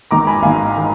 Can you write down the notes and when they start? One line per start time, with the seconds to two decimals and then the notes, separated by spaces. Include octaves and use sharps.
0.11 G#1 G#2 D#3 A#5 D6
0.27 G#5 B5
0.42 G#1 G#2 D#3 F5 G#5
0.77 D#3